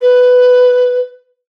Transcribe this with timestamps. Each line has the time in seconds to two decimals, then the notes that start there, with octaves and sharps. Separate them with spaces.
0.01 B4